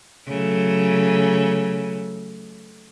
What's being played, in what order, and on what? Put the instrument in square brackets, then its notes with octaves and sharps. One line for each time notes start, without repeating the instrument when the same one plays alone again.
[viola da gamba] C#3 F#3 A3